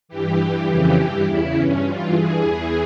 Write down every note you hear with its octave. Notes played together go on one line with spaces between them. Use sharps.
G2 E3 G4
G2 E3
F2 C#3 E3
G2 E3 G4
E2 C#3 E3 E4
G2 E3 C#4
G2 E3 F4
G2 E3 G#4
E2 E3 G#4